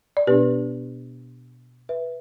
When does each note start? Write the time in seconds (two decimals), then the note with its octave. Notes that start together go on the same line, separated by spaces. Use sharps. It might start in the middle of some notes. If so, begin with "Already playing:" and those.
0.17 D5
0.27 B2 B3 D4 G4 B4
1.89 B4 E5